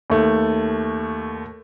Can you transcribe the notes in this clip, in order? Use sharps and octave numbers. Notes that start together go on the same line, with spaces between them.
D#2 A3